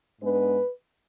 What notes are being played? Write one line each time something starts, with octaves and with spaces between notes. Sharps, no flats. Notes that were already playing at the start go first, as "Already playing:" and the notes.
G#2 G#3 B3 D4 B4